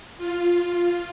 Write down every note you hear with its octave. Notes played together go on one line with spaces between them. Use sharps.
F4